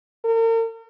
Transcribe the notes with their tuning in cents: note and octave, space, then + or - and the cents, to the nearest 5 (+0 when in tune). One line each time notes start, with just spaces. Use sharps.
A#4 -40